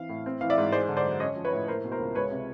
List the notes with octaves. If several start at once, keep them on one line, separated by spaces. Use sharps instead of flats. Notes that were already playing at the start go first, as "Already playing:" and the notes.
Already playing: E3 C4 F5
A2
C4
E3 F5
D5 E5
G#2
G#3 C5 D5
D3
C5 D5
F#2
C#4 C#5 D#5
F3
B4 C#5
A2
A#3 A#4 C5
B2
A#4 C5
C#2
G#3 B4 C#5
C3